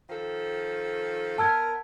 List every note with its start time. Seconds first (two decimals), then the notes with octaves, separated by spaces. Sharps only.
0.10 D#3 F3 A4
1.38 B3 A#4 A5 E6 G#6